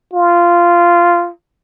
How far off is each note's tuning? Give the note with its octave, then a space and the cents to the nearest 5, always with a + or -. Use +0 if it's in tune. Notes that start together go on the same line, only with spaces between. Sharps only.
F4 -10